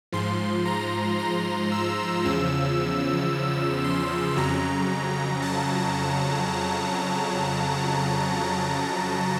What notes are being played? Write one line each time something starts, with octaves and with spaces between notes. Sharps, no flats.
G#2 F3 C6
A#5
A#5
E6
E2 C#3 F3 E6
C6
F2 C#3 F#3 A#5
A5